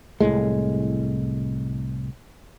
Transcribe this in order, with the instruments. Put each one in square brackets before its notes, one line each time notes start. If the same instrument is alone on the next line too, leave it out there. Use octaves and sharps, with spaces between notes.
[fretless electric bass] C2 F#2 A2 G#3